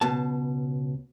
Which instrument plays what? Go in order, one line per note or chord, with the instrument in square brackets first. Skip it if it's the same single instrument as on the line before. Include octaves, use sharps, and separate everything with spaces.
[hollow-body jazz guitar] C#2 B2 A5